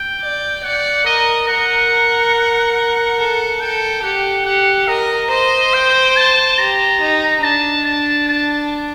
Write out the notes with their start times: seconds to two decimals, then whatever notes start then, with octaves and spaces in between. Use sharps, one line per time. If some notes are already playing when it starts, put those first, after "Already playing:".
Already playing: G5
0.22 D5
0.64 D5 F#5
1.06 A#4 D#5
1.48 A#4 F#5
3.19 A4 F#5
3.61 A4 G5
4.03 G4 F#5
4.46 G4 F#5
4.88 A#4 D#5
5.31 C5 D#5
5.74 G5
6.17 A5
6.58 G4 A#5
7.01 D#4
7.44 D4 A5
7.86 A5
8.29 A5